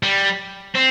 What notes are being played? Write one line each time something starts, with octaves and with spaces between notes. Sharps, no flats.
G3
C4